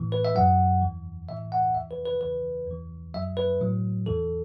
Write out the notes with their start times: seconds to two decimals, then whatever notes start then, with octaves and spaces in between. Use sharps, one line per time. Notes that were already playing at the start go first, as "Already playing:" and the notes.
Already playing: A2 E3
0.12 B4
0.25 E5
0.35 F#2 F#3 F#5
0.82 E2 E3
1.29 A2 E3 E5
1.52 F#5
1.75 E2 E3 E5
1.91 B4
2.06 B4
2.21 E2 C#3 E3 B4
2.67 E2 E3
3.14 F#2 F#3 E5
3.37 B4
3.61 A2 F#3
4.06 E2 E3 A4